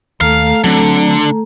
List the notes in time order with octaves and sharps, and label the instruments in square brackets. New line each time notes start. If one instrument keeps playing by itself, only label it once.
[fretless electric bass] D#2 [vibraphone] A3 A4 A#5 [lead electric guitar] F5
[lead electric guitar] D3 [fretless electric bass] F#3 C4